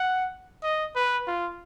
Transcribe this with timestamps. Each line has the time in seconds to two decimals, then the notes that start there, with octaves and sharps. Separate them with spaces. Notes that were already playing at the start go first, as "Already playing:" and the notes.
Already playing: F#5
0.63 D#5
0.96 B4
1.27 F4